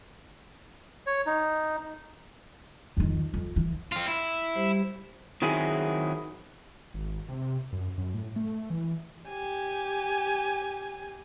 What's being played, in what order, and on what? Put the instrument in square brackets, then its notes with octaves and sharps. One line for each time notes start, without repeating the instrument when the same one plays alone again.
[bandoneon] C#5
D#4
[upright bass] F2 D#3
F2
E3
[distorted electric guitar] C4 F4
E4
[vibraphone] G3 G4 C5
[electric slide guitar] D#3 F#3 C4 E4 G#4
[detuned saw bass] G#1
C3
F#2
F#2
A2
A3
E3
[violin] G4 G#5